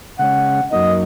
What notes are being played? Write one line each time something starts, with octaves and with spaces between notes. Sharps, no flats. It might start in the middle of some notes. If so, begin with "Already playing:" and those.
C#3 G#3 C#4 F#5
F#2 F#3 A#3 D#4 D#5